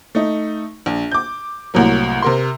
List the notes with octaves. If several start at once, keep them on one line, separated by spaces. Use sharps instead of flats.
A3 D#4
A#1
D6 G6
C2 A2 F#3 A#3
C3 A#4 C6